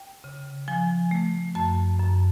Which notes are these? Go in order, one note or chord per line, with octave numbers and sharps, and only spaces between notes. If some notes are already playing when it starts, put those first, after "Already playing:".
Already playing: G5
C#3
F3 G#5
A3
F#2 A5
F#2